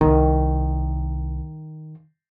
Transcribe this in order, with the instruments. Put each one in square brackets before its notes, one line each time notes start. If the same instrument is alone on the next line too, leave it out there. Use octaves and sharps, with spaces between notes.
[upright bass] C2 [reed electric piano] D#3